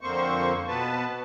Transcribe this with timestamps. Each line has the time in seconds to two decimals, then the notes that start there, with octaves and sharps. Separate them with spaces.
0.01 F2 D3 A#3 C4 C5 C#6
0.68 B2 B3 B4 A5